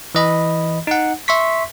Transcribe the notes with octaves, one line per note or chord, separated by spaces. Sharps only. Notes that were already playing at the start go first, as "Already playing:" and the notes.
E3 D#5 B5
D#4 F#5
E5 C6 C#6 B6